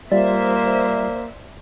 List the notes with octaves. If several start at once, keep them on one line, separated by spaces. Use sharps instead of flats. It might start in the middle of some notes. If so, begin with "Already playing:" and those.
G3 A#3 F4 C5 D5 E5